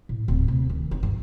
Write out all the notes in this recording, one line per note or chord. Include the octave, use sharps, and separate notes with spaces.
A2
D1
C3
D#3
D#4
G2